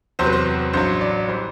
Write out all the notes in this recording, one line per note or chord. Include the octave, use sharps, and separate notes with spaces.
E2 C3 F#3 C5
B4
C5
A1 G2 F#3 C5
D5
E3 G3 C5